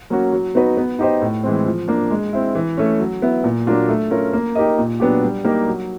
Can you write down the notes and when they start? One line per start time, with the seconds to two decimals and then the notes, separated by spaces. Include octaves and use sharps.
0.10 F#3 A#3 C#4 F#4
0.33 F#3
0.55 B3 D#4 F#4 B4
0.77 B3
0.99 D#4 G4 C5 D#5
1.22 A2
1.43 E3 G#3 C4
1.66 F3
1.88 A#3 D4
2.11 G#3
2.33 C4 E4
2.55 E3
2.77 A3 C#4
3.00 F#3
3.22 B3 E4
3.44 A#2
3.67 F#3 A#3 D4 F4
3.89 A3
4.11 C#4 F4 A#4
4.33 A#3
4.55 D#4 G4 A#4 D#5
4.78 A#2
5.00 F#3 B3 D4 G4
5.22 G3
5.45 A#3 D#4 G4 A#4
5.67 F#3